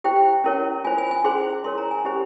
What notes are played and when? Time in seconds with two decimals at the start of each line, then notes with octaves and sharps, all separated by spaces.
0.04 E4 G4 C5 G5
0.44 C#4 E4 A#4 C#5
0.85 F4 C5 G#5
0.98 G#5
1.11 G#5
1.24 C#4 E4 G#4 C5 C6
1.64 E4 A#4 C#5 C6
1.78 A#5
1.91 G#5
2.04 C#4 G4 C5 E5